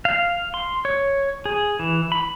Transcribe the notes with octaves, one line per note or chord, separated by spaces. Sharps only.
F5
C6
C#5
G#4
E3
B5